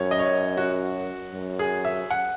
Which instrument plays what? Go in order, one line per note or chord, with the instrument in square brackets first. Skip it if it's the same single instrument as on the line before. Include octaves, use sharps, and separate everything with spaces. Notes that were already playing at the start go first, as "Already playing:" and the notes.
Already playing: [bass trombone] F#2 [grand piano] C#5
[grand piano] D#5
C#5
F#4
[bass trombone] F#2
[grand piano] G#4
E5
F#5